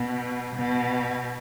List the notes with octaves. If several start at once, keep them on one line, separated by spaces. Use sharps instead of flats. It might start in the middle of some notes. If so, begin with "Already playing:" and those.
Already playing: B2
B2